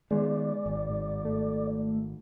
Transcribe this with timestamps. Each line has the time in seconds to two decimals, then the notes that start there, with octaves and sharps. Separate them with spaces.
0.11 D#3 G#3 B3 D5
0.66 G#1
0.90 G#2
1.25 A3